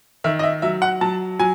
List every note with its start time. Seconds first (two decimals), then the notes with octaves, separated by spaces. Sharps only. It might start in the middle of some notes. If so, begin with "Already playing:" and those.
0.24 D#3 E5
0.39 D#5
0.43 E5
0.62 F#3 E5
0.82 F#5
1.01 F#3 A5
1.39 F#3 G#5